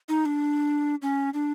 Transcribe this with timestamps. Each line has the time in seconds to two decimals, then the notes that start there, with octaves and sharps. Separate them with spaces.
0.09 D#4
0.25 D4
1.02 C#4
1.34 D4